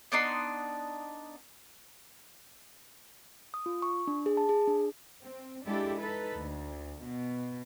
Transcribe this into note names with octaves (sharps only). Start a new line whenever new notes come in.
B3 D4 D#4 C6
D#6
F4
C#6
D4
G#4
A5
G#4
D4
C4
G#3 D4 E4 G4 A4
D#4 A4 B4
D2
B2